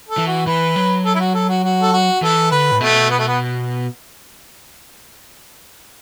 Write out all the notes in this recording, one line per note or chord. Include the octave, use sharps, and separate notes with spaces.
A4
E3
F#4
E3 B4
F#3
A4
E4
F#4
A4
F#4
F#4
A4
F#4
E3 A4
D3 B4
A2
B2 A3
B3
A3
B3